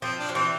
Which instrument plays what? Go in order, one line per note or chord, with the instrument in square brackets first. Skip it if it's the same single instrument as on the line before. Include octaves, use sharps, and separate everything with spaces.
[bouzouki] F3 [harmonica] C4
[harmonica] D4
[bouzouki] F3
[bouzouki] E3 [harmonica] C4